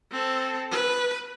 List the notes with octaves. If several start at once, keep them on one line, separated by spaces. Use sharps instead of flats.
C4 A4
B4